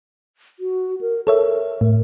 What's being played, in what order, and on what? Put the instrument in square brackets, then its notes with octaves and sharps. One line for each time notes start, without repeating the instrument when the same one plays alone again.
[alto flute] F#4
A#4
[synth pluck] A4 C#5 E5 [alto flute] A#4
[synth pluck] A2